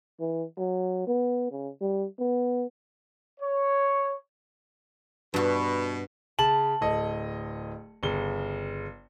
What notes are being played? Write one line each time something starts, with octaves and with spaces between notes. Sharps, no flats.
E3
F#3
B3
C#3
G3
B3
C#5
G2 B2 F#4
C#3 A5 F#7
D1 A4 D#5
G1 C#3 G7